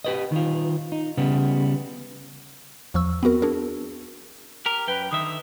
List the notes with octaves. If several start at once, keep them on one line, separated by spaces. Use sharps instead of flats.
G4 B4 D#5
D#3 F4
D#4
C#3 G3 B3
E2 F3 C#6 E6
B3 C4 F#4 A#4
D4 G#4 A#4
G4 A#4
F#2 B4 G5
D3 D#3 E5 D#6